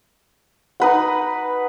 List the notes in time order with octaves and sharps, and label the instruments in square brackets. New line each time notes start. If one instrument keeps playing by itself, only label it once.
[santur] D#4 B4 F#5